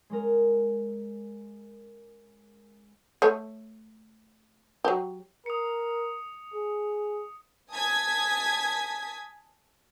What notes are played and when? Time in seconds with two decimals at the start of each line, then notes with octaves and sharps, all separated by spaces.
0.10 G#3 C#4 A#4
3.22 A3 C#5
4.85 F#3 G4
5.46 A#4 D#6 C#7
6.53 G#4
7.72 G#5 A5 D#6 G#6 B6